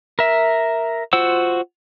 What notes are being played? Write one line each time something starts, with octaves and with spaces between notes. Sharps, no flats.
A#4 E5
F4 F#4 C5 F#5 E6